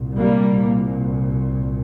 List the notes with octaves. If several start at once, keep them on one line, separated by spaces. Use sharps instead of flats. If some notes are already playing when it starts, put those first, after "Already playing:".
Already playing: C2 A#2
G3 A#3